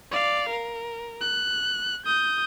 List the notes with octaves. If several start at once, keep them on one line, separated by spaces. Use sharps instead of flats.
D5 F5
A#4
F#6
D#6 G6